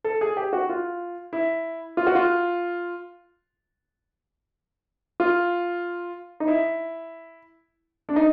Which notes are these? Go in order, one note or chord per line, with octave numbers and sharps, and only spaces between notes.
A4
G#4
G4
F#4
F4
E4
F4
F#4
F4
F4
D#4
E4
D4
D#4